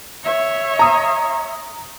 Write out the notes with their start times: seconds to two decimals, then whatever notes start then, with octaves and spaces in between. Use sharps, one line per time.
0.24 C#5 E5
0.79 A#5 D#6